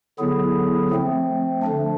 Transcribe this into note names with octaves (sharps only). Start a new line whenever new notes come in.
D3 F#3 B3 E4 G#4
F3 A3 C4
D3 F3 A3 D4